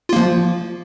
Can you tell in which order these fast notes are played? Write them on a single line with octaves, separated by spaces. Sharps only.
F4 A#3 F3